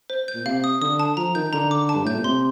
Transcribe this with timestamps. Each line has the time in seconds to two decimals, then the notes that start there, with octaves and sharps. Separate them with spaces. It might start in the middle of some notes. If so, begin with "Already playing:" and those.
0.10 C5
0.28 G6
0.35 A#2
0.46 C3 F5
0.64 D#6
0.82 D3 D#6
0.99 A5
1.17 F3 A#5
1.35 D#3 G6
1.53 D3 A#5
1.71 D6
1.89 A5
1.95 G2
2.05 A2 G6
2.15 A#2
2.24 C3 C6